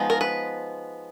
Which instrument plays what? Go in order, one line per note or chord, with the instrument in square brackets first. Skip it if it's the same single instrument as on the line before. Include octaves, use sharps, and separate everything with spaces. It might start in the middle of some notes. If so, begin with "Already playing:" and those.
Already playing: [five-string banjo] F3 G#3 B3 D#4
A#4
B4